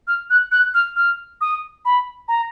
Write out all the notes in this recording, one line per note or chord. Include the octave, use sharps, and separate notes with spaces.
F6
F#6
F#6
F6
F6
D#6
B5
A#5